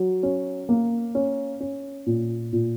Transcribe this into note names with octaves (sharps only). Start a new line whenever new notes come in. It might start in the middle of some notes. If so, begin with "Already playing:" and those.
Already playing: F#3
C#4
A#3
C#4
C#4
A#2
A#2